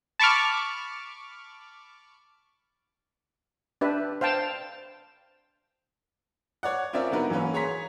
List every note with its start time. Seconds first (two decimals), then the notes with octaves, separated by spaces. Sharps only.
0.20 A5 B5 C#6 D6 F6
3.81 D4 G4 B4 E5
4.21 C5 F5 G5 A5
6.63 C#5 D5 F#5
6.93 C4 C#4 F4 A#4 D5 E5
7.11 D3 B3 D#4 F#4 A#4 B4
7.30 E3 F#3 A#3 C#4 B4
7.54 G#4 C#5 A#5 C6 B6